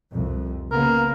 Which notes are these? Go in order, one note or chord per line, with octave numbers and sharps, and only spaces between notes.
C2 F2
C#3 A#3 B3 A#4